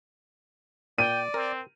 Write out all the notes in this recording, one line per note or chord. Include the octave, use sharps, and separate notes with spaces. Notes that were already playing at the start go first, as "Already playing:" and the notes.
A#2 D5 G5 D#7
C4 A#4